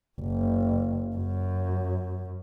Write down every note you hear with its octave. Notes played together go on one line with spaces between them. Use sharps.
F#1
F#2